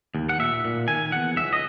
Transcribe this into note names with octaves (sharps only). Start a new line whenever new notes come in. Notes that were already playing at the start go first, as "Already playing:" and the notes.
D#2
F#5
A#2 E5
A#2
D#3 G#5
E2 F#5
C#2 E5
D#5